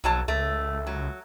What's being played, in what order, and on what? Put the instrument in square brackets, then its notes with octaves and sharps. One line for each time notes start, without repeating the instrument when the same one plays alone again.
[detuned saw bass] B1 [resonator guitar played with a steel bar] F2 F#3 A5
[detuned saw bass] C#2 [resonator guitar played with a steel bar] A3
[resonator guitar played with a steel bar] F#3